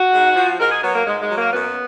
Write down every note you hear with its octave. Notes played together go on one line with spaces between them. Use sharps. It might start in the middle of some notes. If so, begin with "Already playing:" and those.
Already playing: F#4
G#2
F3
G#2 A#4
G#4
F#3 B3
A#3
G#2 G#3
G#3
F#3
A#3
F#2 B3